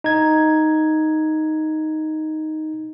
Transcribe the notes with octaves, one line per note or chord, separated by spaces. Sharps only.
D#4 G#6